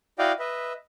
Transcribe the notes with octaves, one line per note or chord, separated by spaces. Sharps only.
E4 F#4 D5 D#5 F5 G5
B4 D#5 E5